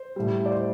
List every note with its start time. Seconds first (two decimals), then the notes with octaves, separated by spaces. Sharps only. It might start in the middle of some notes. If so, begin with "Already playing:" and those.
Already playing: C5
0.16 A2 G3
0.46 D5
0.51 C5